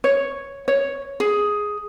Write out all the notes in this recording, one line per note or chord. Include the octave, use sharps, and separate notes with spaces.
C#5
C#5
G#4